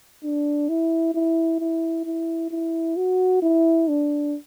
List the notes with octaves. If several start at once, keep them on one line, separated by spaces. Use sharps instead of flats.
D4
E4
E4
E4
E4
E4
F#4
E4
D4